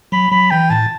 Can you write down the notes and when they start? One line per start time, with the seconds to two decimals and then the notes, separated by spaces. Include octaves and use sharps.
0.12 F#3 B5
0.31 F#3 B5
0.51 E3 G5
0.70 A2 A5